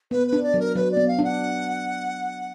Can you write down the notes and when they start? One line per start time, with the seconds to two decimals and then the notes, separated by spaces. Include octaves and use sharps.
0.11 B3 B4
0.27 B4
0.33 D4
0.43 D5
0.54 F#3
0.59 A#4
0.76 F#3 B4
0.91 D5
0.97 B3
1.08 F5
1.19 D4
1.24 F#5